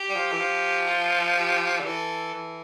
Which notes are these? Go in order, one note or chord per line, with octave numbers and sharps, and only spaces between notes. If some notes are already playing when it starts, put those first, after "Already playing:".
Already playing: G4
G3
F3
E3
F3
F4
G4
D3
E3 A4
E3